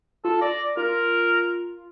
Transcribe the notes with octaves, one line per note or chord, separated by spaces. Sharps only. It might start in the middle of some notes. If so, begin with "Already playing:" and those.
F4 A4
D5 A#6
F4 A#4